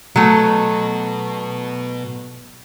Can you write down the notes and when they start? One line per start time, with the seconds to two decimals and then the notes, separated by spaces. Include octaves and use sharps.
0.16 B2 F#3 A3